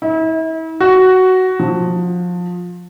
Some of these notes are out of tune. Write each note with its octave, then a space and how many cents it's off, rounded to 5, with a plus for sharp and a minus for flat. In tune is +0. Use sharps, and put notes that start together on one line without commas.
E4 -40
F#4 +10
F3 +25